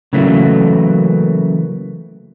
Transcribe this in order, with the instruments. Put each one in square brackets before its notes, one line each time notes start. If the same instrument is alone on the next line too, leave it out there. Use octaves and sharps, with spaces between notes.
[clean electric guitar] C#3 E3 F#3 A3 A#3